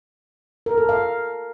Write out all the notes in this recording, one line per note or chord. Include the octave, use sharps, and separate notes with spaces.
A#4
A4
F5